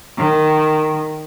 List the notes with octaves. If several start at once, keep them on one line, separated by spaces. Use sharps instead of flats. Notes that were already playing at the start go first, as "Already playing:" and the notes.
D#3